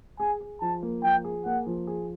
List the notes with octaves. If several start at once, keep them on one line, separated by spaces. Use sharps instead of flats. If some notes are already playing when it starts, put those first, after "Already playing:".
G#4 G#5
G#4
F3 A5
A#3
F3 G5
G#4
A#3 F#5
F3
G#4